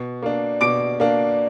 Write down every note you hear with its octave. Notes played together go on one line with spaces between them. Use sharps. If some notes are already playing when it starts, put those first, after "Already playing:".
Already playing: B2
A#3 D4
B2 D6 D7
A#3 D4